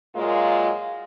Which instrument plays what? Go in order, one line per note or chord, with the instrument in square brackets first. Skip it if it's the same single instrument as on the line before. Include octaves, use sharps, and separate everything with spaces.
[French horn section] A#2 F#3 G#3 A#3 F4